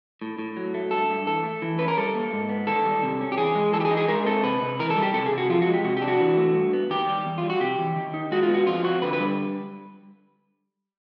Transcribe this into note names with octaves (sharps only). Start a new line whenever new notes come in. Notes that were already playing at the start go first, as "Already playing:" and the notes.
A2
A2
F#3
A3
G2 A4
G2
E3 A4
A3
E3
C#4 B4
A#4
G3 A4
A#3
G#2
B3
D#3 A4
G3
C3
C#4
G4
E3 G#4
G#3
E3 A4
G4
G#4
D#4
G#4
G#3 A#4
C4 A4
C3 B4
C3
E3 A#4
A4
G3
G4
C3 A4
G#4
C3
F#4
F3 F4
F#4
G#3
G4
C3 F#4
G4
D4
F#4
E3
A3
G2
B3
D#3 G4
G3
E2
G3 F4
F#4
C3 G4
E3
D#3
D#4
G#3 F#4
F4
B3
F#4
F2 F4
C4 F#4
D3 B4
B4
G3